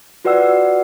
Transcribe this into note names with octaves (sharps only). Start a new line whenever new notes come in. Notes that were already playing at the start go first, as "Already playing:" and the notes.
F4 F#4 B4 D5 F#5 E6